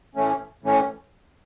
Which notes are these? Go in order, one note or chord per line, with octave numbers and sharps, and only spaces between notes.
A2 E3 A3 C#4
A2 E3 A3 C#4